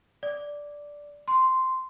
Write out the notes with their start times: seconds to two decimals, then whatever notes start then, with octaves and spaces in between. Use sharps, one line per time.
0.23 D5
1.28 C6